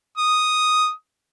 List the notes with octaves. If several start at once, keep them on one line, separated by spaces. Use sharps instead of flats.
D#6